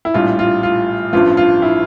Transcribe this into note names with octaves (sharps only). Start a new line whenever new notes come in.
E4
A#1 A2 G3 F4
F4
F4
A1 G2 F3 F4
F4
E4